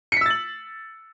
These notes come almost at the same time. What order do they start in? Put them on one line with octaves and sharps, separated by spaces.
C#7 B6 E6 A6 F#7